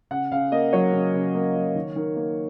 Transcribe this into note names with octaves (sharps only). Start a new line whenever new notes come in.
C#3 F#5
C#3 F5
A#3 D#5
F#3 C#5
C#3
C#3
A#3
F#3
D#3
D#3
A#3